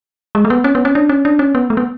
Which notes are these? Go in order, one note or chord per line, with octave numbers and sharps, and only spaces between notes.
G#3
A3
B3
C#4
B3
C#4
D4
C#4
D4
C#4
B3
A3
B3